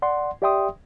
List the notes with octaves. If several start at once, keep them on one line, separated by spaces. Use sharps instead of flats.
D5 F#5 C6
G4 D5 E5 G5 C6 D#6